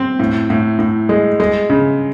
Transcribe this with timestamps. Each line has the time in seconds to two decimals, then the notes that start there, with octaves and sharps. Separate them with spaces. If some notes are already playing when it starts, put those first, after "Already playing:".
Already playing: C4
0.20 A2
0.50 A2
0.79 A2
1.09 G#3
1.40 G#3
1.70 C#3